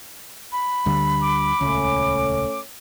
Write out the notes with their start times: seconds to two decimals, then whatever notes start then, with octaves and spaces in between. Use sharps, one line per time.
0.52 B5
0.86 D2 D3 G3
1.21 D6
1.61 D#1 C#2 A3 C#4